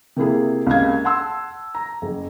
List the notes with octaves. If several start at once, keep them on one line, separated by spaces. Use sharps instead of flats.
C3 A#3 E4 G#4
C#2 C3 A#3 F5 G#6
F#5 A5 C6 E6
A#5
F#1